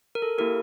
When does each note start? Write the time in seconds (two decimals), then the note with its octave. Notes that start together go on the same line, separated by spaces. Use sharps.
0.15 A#4
0.22 A4
0.38 A#3 E4 G4 A#4